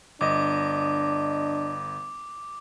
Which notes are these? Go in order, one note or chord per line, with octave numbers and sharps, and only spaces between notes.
G1 D4 D#5 D6